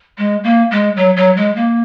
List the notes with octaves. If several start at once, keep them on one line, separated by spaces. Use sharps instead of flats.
G#3
A#3
G#3
F#3
F#3
G#3
A#3